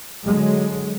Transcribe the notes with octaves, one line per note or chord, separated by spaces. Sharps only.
D3 F#3 G#3